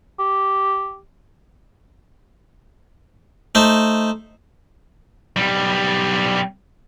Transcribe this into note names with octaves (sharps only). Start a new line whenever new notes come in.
G4
A3 D#4 C5
B1 G3